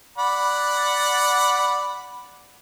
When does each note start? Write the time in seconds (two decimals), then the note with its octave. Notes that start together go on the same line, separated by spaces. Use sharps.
0.18 D5 F#5 B5